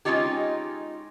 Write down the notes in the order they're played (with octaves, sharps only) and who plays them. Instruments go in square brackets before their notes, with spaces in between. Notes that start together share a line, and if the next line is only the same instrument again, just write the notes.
[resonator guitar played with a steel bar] G#3 A3 C#4 D#4 F4 G4